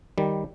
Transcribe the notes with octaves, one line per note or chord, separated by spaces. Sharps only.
D#3 G3